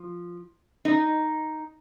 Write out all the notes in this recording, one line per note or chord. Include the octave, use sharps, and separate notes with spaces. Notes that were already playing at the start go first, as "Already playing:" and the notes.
Already playing: F3
D#4